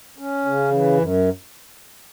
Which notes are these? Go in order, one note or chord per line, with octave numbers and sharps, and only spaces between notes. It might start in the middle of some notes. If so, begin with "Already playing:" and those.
C#4
C#3
E3
F#2